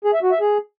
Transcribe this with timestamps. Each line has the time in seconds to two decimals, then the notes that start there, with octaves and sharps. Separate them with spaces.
0.05 G#4
0.14 E5
0.23 F#4
0.31 E5
0.40 G#4